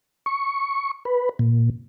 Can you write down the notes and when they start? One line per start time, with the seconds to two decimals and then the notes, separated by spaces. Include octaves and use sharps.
0.26 C#6
1.05 B4
1.39 A#2